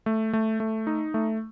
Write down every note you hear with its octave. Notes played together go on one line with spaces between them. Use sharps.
A3
A3
A3
D#4
A3